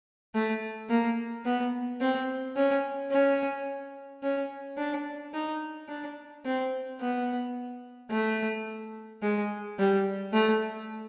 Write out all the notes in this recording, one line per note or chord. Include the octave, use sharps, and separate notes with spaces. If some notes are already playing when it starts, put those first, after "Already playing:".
A3
A#3
B3
C4
C#4
C#4
C#4
D4
D#4
D4
C4
B3
A3
G#3
G3
A3